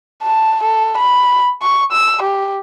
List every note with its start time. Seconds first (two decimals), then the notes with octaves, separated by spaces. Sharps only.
0.23 A5
0.63 A4
0.98 B5
1.62 C#6
1.92 E6
2.23 G4